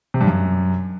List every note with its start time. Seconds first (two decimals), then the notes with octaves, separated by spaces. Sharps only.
0.14 C3
0.21 G2
0.27 F#2